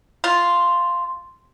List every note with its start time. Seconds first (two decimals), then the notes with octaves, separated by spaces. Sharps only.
0.24 F4